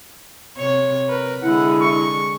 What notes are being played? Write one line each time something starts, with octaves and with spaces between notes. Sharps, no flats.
C3 C#5
A#4 B4
D3 G#3 E4 F#5
C#6